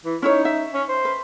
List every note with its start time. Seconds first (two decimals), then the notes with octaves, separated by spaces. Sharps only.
0.05 E3
0.22 C#4 D#4 E4 C#5
0.45 E5
0.74 C#4
0.89 C5
1.05 B4